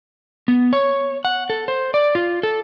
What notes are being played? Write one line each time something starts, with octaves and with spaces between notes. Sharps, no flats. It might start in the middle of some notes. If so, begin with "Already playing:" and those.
B3
C#5
F#5
A4
C5
D5
F4
A4